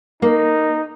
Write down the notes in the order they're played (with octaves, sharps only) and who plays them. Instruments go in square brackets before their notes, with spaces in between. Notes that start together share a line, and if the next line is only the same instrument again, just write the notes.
[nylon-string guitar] A#3 [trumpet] D#4